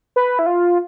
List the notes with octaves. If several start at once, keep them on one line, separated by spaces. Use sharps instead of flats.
B4
E4
F4